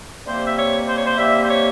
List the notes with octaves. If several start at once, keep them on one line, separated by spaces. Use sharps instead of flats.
C3 G3 A#3 C5
E5
C#5
C5
C#5
C5
C3 G3 A#3 E5
C5
C#5